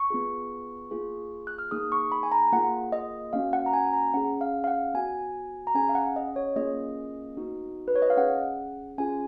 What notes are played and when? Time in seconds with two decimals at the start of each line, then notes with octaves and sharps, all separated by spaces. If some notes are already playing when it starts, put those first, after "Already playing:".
Already playing: C#6
0.10 B3 F4 G#4
0.91 A#3 F4 G#4
1.47 F#6
1.59 F6
1.71 A#3 D#4 G#4 D#6
1.92 C#6
2.12 B5
2.23 G#5
2.32 A#5
2.52 A#3 F4 G#4 F#5
2.92 D#5
3.33 A#3 C#4 F#4 F5
3.53 F#5
3.66 A#5
3.73 G#5
3.93 A#5
4.14 C#4 G#4 F#5
4.41 F5
4.64 F5
4.67 F#5
4.94 B3 F#4 G#5
5.67 A#5
5.75 C#4 G#4 G#5
5.89 F5
5.95 F#5
6.16 D#5
6.36 C#5
6.56 A#3 C#4 F4 G#4 D#5
7.37 B3 D#4 F#4
7.88 B4
7.96 C#5
8.02 D#5
8.10 F5
8.17 C#4 G#4 F#5
8.98 C#4 F4 G#4 G#5